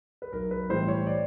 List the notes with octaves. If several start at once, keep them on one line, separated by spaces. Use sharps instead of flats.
B4
B1 A#4
B4
A2 E3 G3 C5
C#5
D5